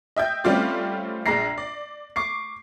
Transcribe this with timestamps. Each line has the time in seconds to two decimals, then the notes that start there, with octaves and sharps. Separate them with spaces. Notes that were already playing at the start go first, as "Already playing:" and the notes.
0.16 D#5 E5 G5 G6
0.44 G3 A3 C4 C#4 F4 D5
1.26 A#1 G#3 D4 A#5 A#6 C7
1.58 D5
2.16 C#6 D6 C7